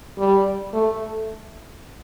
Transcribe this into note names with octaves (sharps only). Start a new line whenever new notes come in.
G3
A3